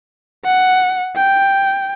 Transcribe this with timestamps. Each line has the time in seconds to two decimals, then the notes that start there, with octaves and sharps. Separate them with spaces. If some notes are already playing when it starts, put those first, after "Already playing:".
0.45 F#5
1.16 G5